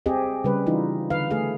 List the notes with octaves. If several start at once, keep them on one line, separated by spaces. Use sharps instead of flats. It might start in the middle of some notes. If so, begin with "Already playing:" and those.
C4 G4 G#4 D#5
C#3 G3 B4
E3 D#4 F4
D3 B4 F5
A3 G#4 F5